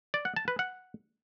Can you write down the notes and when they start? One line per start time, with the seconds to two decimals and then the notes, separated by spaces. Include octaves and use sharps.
0.14 D5
0.25 F#5
0.36 A5
0.48 B4
0.59 F#5